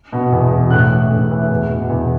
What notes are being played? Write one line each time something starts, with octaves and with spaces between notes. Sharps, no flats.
B2
E2
B2
A2 F#6
E3
A2
E3
E2
B2
E2